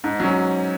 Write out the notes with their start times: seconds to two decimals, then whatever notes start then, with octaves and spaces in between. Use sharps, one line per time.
0.04 G#2
0.20 F#3 C#4